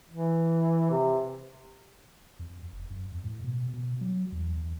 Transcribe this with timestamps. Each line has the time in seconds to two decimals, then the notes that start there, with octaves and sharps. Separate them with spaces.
0.10 E3
0.91 C3
2.39 F2
2.73 F1
2.90 F#2
3.12 F2
3.24 A2
3.44 B2
3.73 B2
4.01 F#3
4.32 E2
4.57 E2